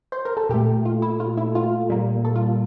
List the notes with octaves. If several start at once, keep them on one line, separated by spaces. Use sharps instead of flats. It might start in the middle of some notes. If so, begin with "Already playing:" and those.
C5
A#4
A4
A#2 A3 G4
F4
E4
F4
E4
F4
A#2 G3 A#3
A4
F4